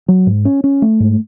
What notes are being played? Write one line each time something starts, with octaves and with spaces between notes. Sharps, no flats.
F#3
G#2
C#4
C#4
A3
G#2